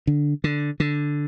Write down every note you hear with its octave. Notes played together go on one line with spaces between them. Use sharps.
D3
D3
D3